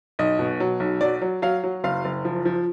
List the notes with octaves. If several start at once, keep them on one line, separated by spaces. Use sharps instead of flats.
B1 D#5
B2
F#3
B1
F#3 D5
F#3
F#3 F5
F#3
F#1 F5
F#1
F3
F3